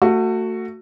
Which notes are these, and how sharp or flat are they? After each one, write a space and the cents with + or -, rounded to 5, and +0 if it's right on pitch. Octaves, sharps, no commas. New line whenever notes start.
A3 +25 F#4 +0